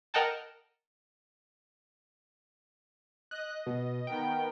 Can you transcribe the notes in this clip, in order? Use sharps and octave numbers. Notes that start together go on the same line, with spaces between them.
A#4 D#5 F#5 G5 A5
D#5 F#6
B2
D#3 B3 A#4 G5